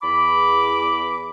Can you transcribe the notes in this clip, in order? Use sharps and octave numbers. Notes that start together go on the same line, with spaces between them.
E2 B5 D6